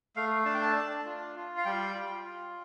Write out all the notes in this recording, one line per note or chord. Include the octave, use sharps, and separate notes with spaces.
A3 F5
D4 A5
G5
A5
D4
F4
F4
F5
G3 G5
F4
F4